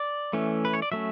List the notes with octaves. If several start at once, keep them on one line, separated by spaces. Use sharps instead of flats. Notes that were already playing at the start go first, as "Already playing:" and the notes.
Already playing: D5
E3 A3 C#4
B4
C#5
D5
F#3 A3 C#4 E5